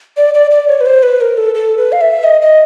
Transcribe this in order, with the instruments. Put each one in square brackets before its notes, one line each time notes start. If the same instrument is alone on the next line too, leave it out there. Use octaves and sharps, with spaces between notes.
[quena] D5
D5
D5
C#5
B4
C5
B4
A#4
A4
A4
B4
F5
E5
D#5
D#5